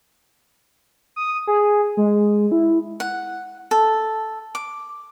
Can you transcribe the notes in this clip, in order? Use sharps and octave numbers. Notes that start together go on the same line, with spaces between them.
D#6
G#4
G#3
E4
F#5
A4
D6